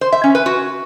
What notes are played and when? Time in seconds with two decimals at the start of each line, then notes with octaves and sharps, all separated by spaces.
0.01 C5
0.12 E5
0.24 C#4
0.35 B4
0.46 F#4